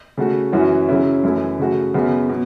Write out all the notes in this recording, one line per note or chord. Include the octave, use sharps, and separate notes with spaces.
C#3 A3 F#4
F#2 E3 C#4 F#4
C#3 F#3 C#4 E4
F#2 E3 A3 E4
C#3 A3 F#4
F#2 C#3 F#3 B3
B2